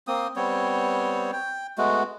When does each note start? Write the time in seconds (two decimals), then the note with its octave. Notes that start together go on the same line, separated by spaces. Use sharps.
0.07 A#3 C4 D#6
0.36 G3 B3 C4 C#5
1.33 G5
1.78 G#3 A3 B3 F#4